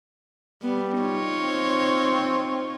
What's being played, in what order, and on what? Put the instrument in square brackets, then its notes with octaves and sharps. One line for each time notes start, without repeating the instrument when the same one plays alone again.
[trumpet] G3 [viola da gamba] B3
[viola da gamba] D#4 F4 C#5
[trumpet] C4